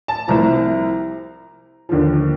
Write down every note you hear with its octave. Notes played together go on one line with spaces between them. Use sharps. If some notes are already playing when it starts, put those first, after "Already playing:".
A5
C2 C3 F3 A#5
D#2 D3 F3